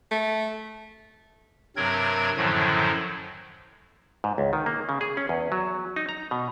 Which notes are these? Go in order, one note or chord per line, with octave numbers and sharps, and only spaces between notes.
A3
G2 C3 F#3 C4 A#4 G#6
F#2 A2 D3 D#3 F3 F#3
G#2
C#2
D#3
A#3
C#3
G#4
C#4
E2
F#3
D#4
A#5
B2